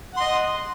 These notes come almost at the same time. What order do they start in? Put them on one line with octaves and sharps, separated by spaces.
F#5 C6 D#5